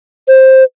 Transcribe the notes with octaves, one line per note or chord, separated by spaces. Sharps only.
C5